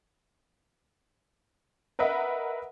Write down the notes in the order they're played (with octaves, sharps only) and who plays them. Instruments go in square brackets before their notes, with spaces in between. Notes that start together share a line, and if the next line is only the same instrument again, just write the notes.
[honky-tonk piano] A#4 B4 D#5 E5 F#5